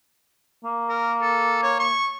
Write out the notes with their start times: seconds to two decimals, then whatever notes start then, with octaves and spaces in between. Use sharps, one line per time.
0.64 A#3
0.89 A#4
1.22 A4
1.63 C#5
1.80 C#6